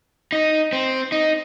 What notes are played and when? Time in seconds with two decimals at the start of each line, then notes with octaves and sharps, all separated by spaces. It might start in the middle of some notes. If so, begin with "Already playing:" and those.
0.32 D#4
0.73 C4
1.12 D#4